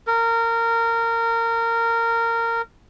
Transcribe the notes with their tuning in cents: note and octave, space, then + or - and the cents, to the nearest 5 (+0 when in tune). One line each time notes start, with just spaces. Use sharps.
A#4 -20